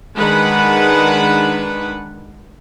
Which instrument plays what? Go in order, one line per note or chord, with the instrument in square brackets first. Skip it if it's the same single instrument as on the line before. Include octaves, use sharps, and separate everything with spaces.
[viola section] D#3 G#3 D4 B4 F#5